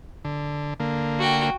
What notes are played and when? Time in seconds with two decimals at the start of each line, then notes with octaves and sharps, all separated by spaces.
0.25 D3
0.80 D3 A#3
1.19 F#4 G5